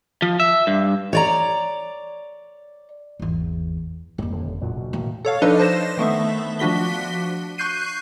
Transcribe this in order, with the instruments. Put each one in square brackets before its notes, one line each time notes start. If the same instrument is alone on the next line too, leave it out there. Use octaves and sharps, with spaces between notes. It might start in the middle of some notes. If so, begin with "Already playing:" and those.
[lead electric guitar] F3
E5
G2
[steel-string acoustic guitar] C#5 D5 A#5
[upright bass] G#1 E2
[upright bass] F2 A#3 [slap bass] G#2 F#3 G3
[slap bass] D#1 D3
[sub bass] F#1
[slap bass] F#1 D2 F#3 [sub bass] A#2
[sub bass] B2
[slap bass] A2 D#3 A#3 [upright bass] E3
[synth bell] A4 C#5 F5
F3 D4 D#4 A4 B4 D#5
C5 A#6 E7
D#3 A3 B3 E5
F3 D4 F#4 B6 G7
C#6 F#6 G6 C7 D#7